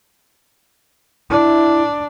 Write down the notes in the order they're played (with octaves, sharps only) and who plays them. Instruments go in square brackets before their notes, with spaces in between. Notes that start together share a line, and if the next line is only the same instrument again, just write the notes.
[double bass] D4 [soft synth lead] E4